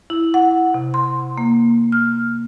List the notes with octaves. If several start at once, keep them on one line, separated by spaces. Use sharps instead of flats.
E4
F#5
C3
C6
A#3
F6